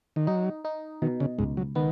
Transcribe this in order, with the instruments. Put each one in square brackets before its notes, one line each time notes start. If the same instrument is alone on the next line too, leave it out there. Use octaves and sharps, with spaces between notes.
[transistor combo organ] D#3
[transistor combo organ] F#3 [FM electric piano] D#4
[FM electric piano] D#4
[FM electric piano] B2 [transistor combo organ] D#3
[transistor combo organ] C#3
[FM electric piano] C#2 [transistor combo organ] G#2
[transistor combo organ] F#3
[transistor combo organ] D#3 [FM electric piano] B3